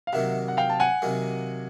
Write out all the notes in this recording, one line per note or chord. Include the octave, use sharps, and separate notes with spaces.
F5
C3 D#3 F#3 A#3 E5 F#5
F#5
F5 G5
A5
F#5 G#5
C3 D#3 F#3 A#3